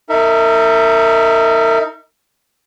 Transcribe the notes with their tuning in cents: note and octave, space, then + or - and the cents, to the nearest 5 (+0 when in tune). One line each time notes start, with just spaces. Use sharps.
D#4 +20 A#4 -35 E5 +0